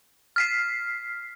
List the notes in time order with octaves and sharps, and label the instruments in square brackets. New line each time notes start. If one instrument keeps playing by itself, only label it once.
[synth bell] F6 B6 C7